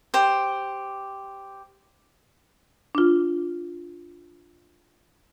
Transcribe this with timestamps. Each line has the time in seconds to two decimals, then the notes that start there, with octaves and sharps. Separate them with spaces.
0.14 G4 C5
2.95 D4 F4